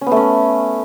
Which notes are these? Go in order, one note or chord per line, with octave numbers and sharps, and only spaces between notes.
C#4
B3
A3
C#4